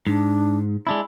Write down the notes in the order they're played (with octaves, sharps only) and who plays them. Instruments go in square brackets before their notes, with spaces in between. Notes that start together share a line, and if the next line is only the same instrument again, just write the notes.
[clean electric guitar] G#2 [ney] D4
[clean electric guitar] G#3 D4 E4 [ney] D5